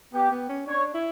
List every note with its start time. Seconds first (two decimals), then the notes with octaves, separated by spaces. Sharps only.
0.13 B3 G4
0.31 B3
0.49 C#4
0.67 D4 C#5
0.94 E4